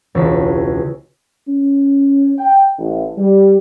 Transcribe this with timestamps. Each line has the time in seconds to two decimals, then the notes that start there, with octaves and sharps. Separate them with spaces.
0.15 E1 C#2 B6
1.48 C#4
2.38 G5
2.78 A1
3.18 G3